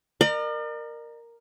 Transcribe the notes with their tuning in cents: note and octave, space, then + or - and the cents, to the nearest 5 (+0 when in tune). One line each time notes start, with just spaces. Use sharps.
A#4 +0 D5 +45